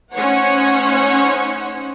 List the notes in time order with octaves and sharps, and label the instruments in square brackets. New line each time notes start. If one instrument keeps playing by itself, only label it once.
[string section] A3 C#4 D#4 C5 C#5 F#5